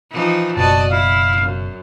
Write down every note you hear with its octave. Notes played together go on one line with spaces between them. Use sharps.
E3 F3 D#4
F#1 B2 F#4 D5 D#5 A5
E4 F5
F#2